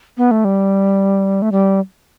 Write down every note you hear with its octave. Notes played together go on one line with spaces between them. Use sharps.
B3
A3
G3
A3
G3